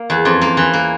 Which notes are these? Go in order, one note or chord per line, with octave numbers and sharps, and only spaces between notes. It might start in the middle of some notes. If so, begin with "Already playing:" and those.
Already playing: A#3
E2
F2
A#3
E3
A#3